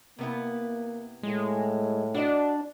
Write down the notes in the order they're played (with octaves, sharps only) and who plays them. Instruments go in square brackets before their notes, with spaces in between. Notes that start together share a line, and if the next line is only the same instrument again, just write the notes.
[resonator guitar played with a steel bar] C3 B3 E4 [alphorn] A#3
[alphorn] A2 [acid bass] G#3
[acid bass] D4 [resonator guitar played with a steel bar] F#4 D5 D#5